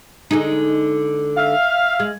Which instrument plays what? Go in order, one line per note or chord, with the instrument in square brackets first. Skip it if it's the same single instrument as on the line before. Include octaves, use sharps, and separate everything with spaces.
[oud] D3 G#3 D#4
[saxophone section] E5 F5
[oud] G#3